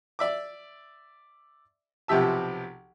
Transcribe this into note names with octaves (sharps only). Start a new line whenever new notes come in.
D5 E5 D6
B1 C3 F3 G4 E5 A5